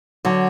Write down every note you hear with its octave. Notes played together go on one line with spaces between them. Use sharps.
D3 F#3